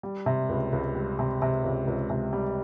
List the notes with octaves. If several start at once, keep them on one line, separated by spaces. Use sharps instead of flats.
G3
C3
C#2
C#2
G3
C3
C3
C#2
C#2
C3
G3